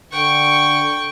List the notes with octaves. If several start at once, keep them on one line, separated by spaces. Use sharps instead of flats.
D3 G5 C#6